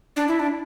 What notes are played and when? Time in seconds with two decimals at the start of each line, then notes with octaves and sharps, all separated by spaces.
0.16 D4
0.28 E4
0.39 D4